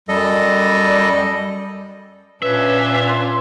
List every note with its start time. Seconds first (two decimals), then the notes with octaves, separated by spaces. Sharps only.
0.09 F#2 G3 A4 D#5
2.42 A#2 C#4 D4 F4 B4 E5
3.08 C6